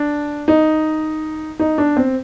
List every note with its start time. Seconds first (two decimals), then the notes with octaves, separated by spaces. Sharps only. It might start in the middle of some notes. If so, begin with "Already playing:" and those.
Already playing: D4
0.48 D#4
1.59 D#4
1.78 D4
1.97 C4